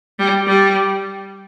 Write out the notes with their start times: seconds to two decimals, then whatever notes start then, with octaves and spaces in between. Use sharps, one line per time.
0.19 G3
0.48 G3